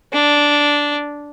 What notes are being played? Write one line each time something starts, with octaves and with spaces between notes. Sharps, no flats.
D4